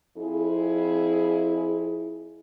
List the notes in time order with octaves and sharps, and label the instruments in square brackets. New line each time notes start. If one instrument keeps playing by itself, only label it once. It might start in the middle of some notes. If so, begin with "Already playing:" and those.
[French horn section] F2 E4 G#4